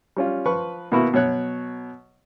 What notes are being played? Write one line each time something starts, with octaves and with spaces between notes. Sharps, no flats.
G3 C#4 F4
F3 B4 C#6
B2 A#3 B3 E4 F#4
B2 F#3 C#5 F#6